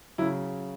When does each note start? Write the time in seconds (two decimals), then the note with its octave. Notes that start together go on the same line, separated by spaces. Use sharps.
0.18 C#3 F#3 E4